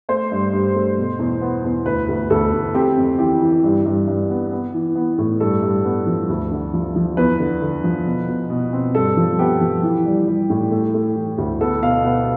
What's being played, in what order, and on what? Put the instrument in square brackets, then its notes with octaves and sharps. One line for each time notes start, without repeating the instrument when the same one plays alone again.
[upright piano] A3 C5
G2
G2
A3
B2
E2
B3
E2
D2 B4
D2
D2 A4
D2
C4 G4
F2
E3 G4
E3
G2
G2
G2
B3
B3
E3
B3
A2
G2 A4
G2
B3
F3
D2
D3
F3
F3
E2 B4
D3
D3
F3
B2
B2
B2
C4
G2 A4
F3
B3 G4
F3
E3
G3
G3
A2
A3
A3
E3
D2
B3 A4
B2 F5
B3